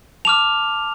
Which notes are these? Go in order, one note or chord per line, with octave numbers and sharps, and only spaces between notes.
A5 D6 F6 F7